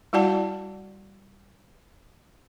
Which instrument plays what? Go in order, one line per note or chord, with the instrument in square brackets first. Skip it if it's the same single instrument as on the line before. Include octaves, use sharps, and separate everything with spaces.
[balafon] G3 E4 F#4 D5 F#5 A5